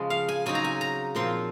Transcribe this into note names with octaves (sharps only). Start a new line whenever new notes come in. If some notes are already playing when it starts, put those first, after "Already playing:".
Already playing: C#3 F3 G#3 G#5
F5
G#5
C#3 F#3 C4 D#4 G#5
A#5
G#5
A#5
A#2 F3 C4 F4 C6